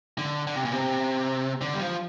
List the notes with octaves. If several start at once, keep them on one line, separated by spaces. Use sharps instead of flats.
D3
D3
C3
A#2
C3
D3
G3
F3